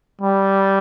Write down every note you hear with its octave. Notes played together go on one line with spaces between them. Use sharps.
G3